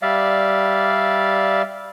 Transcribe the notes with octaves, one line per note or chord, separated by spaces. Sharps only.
G3 D5 E5 F5